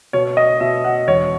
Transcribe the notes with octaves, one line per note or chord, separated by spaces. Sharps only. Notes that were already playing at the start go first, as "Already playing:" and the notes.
B2 C#5
D#5
B2 E5
F#5
E1 C#5